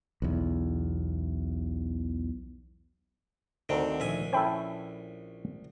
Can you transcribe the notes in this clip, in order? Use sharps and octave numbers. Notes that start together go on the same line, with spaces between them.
B1 E2
D2 D3 D#3 C4
A#1 E5 G#5
C#4 E4 A4 C5 G5 B5